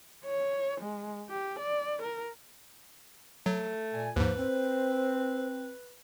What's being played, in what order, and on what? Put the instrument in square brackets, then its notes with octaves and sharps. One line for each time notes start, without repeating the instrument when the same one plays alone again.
[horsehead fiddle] C#5
G#3
G4
D5
A#4
[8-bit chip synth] F#3 [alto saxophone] A3
[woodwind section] A#2 G#5
[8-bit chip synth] D#2 G#2 [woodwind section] F3 A#3 [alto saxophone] B4
[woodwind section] C4 [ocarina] C5